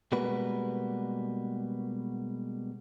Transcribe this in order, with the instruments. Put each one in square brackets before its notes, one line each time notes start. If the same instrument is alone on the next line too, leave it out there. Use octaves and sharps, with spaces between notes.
[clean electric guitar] B2 G3 G#3 A#3 F#4 B4